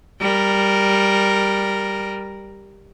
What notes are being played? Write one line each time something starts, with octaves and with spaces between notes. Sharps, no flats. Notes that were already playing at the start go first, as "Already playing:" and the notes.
G3 A#4